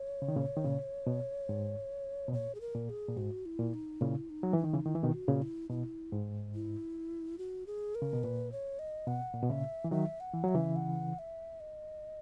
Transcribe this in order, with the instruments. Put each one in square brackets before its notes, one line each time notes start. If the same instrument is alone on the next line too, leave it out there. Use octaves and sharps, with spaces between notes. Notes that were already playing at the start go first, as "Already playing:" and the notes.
Already playing: [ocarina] C#5
[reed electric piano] C#3
D#3
A#2 C#3
D#3
A#2 C#3
B2
G#2
B2
[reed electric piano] A#2 [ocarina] C#5
[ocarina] G#4
A#4
[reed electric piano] A#2
[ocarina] G#4
[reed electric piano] A#2
[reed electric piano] G#2 [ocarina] F#4
[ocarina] E4
[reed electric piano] A#2
[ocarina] D#4
[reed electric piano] A#2 C#3 [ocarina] E4
[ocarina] D#4
[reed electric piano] F#3
[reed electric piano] E3 [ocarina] D#4
[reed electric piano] D#3
C#3 E3
[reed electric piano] D#3 [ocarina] E4
[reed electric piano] E3
B2 D#3
[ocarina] F#4
[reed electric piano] A#2 C#3
[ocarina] E4
[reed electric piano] B2 [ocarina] E4
[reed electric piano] G#2
[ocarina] E4
F#4
G#4
A#4
[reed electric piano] C#3
B2
[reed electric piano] A#2 [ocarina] B4
[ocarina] C#5
D#5
[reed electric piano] B2 [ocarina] F#5
[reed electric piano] A#2
B2
[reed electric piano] A#2 C#3 [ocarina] E5
[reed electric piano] E3
[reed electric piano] D#3 F#3 [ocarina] E5
[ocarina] F#5
[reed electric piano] E3
[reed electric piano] F#3 [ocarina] E5
[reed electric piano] C#3 E3
[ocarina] F#5
E5
D#5